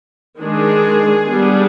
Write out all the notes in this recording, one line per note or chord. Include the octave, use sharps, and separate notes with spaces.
D#3 G#3 D4 G#4
G3 B3 D4